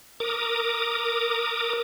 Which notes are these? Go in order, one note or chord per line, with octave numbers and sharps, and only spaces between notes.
A#4 D6 D#6